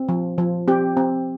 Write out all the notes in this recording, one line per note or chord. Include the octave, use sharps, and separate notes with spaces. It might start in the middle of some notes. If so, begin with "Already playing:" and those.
Already playing: C4
F3
F3
C4 G4
C4